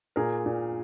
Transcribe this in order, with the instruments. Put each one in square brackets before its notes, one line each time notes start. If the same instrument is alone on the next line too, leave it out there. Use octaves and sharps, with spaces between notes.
[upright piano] A#2 G#4 A#4
A#2